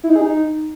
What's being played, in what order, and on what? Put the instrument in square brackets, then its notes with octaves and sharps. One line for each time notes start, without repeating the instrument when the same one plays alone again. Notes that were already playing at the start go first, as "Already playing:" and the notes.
[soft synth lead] E4
D#4
G#4
D#4